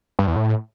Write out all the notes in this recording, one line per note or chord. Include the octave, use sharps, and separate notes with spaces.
G2
E2
A2